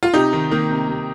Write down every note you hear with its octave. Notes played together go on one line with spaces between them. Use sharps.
F4
C3 D#4 G4
D#3
D#3 A#3
C3
C3